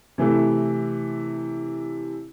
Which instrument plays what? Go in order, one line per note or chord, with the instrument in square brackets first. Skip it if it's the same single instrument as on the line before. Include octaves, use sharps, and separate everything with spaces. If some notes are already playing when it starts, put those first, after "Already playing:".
[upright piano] C3 E3 A3 E4